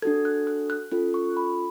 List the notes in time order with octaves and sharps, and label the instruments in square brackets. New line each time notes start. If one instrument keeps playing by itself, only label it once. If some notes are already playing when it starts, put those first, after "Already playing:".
[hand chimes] D4 F#4 A4 G#6
F#6
F#6
F#6
C#4 F4 A4 F#6
C#6
B5